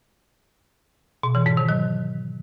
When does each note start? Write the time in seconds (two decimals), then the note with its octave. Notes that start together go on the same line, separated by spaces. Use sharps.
1.23 B2
1.35 E3
1.46 G#2
1.57 D#3
1.69 F#3